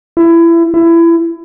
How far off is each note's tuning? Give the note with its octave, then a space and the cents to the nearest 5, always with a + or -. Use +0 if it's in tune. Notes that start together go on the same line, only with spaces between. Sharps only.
E4 +25
E4 +25